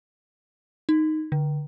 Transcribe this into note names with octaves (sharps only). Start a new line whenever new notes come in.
D#4
D3